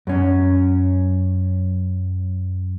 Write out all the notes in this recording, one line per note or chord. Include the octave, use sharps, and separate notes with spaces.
F#2 C#4